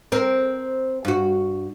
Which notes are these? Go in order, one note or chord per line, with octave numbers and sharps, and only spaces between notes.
C4 A#4
G2 F#4